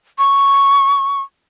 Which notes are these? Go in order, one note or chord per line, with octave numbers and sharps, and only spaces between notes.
C#6